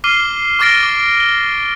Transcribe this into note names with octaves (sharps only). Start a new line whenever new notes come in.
D6 F6 C7 D#7 G7
C#6 D6 F6 A6 A#6 D7
D6
G7